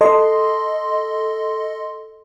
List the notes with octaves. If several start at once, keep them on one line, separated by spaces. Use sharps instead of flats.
A4 D#5 C6